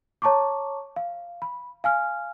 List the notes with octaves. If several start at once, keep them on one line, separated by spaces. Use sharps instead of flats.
C#5 A5 A#5 C#6 D6
F5
B5
F5 G#5 F6